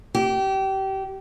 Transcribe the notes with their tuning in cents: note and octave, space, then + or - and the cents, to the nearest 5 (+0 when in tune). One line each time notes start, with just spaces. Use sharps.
G4 -25